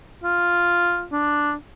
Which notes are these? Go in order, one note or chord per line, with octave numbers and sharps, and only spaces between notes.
F4
D4